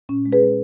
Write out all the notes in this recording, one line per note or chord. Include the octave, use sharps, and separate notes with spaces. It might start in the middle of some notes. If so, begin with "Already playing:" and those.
A#2 C#4
G#3
G#4 B4
G#3